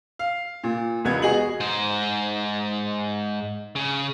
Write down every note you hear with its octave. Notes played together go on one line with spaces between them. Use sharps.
F5
A#2
E1 C#2 B3 G#6
F#4 G#4 D#5 F#7
G#2 C5
C#3